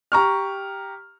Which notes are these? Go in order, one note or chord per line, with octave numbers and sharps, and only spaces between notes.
G4 A#5 C#6 F6